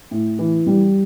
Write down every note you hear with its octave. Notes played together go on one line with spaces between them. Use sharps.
A2
E3
G3